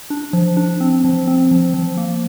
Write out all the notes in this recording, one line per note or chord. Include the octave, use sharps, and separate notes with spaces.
D4
F3
D4
C4
F3
C4
F3
F3
A#3